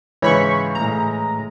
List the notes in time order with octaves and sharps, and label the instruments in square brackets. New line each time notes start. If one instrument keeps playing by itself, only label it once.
[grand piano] G#2 C#3 [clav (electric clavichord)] E3 [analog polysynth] C#5 B5 C#6
[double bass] A2 G#3 [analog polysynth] A#5